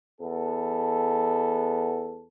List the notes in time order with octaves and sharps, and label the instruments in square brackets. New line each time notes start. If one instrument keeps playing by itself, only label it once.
[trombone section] E2 B3 A4